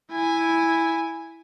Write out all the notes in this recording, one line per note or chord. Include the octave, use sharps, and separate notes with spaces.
E4 G#5